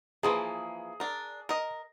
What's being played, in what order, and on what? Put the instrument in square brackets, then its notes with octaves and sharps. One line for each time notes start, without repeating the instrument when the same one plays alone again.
[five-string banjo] E3 F3 A#3 [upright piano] G#4
[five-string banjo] D4 A#4
A#4 D#5